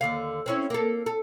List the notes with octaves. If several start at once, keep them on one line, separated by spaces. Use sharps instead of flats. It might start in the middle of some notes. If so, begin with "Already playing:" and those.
D#2 D3 F5
C4 C#4 E4
A#3 A4
A4